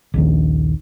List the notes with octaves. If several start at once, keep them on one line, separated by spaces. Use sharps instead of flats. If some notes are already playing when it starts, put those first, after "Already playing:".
A#1 D#2 D#3